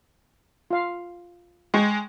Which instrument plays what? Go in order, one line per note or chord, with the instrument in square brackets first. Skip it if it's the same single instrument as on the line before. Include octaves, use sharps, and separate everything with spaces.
[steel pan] F4 F5
[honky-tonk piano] G#3 [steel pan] G5 C#6